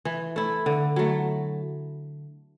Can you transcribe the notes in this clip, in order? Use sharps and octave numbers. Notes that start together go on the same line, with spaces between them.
E3
A3 E4
D3
F#3 A3